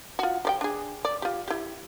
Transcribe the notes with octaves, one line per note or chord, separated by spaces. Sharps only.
F4 F#4
G4 D5 G5
D4 G#4
D5
F4 G4
E4 G4